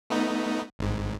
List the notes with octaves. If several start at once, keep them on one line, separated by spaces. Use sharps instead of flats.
A3 B3 D#4
G#1 G#2